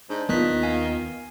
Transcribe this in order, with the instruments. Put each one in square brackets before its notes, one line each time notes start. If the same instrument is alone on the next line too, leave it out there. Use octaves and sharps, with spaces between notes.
[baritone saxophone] G#2 [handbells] D4
[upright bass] D#2 [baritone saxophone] D#3 [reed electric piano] B3 F4 [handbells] D#6 F#6 B6
[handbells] F5 G#5